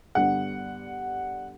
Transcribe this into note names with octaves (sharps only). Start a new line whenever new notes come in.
G2 D3 G3 B3 F#5